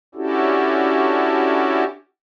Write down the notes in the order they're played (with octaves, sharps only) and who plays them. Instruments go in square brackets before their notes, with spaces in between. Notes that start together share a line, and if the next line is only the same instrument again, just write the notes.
[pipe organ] C#4 D4 E4 F#4 G4 A4